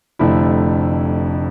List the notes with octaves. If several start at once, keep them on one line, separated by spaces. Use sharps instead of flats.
F1 F2 D3 A3 E4